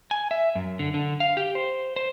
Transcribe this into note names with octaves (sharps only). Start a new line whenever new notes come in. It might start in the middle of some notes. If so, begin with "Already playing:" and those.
G#5
E5
F#2
D3
D3
F5
G4
C5
C5